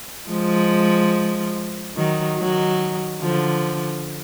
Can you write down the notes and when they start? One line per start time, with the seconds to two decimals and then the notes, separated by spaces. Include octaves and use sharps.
0.30 F3 G#3
1.96 D#3 F#3
2.38 D#3 F#3
3.21 D3 F3